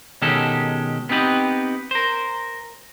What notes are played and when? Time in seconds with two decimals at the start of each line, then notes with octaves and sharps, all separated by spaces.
0.22 B2 D#3 G#3 C#4 G4 A4
1.09 B3 C4 D#4 G4 B4
1.91 A#4 C5